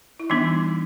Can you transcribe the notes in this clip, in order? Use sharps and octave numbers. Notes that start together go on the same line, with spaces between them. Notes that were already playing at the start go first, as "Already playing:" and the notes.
E4
E3 G3 B3 D4 D#4